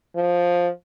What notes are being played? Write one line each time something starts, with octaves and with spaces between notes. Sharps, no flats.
F3